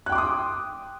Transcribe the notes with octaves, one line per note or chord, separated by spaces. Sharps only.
G5 C6 D6 D#6 F#6